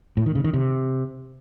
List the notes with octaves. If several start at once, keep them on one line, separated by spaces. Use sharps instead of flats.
A2
D#3
C#3
D#3
C3